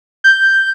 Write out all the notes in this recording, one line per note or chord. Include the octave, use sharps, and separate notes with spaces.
G6